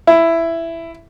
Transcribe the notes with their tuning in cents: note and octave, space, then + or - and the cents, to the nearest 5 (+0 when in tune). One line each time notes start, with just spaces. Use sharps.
E4 +10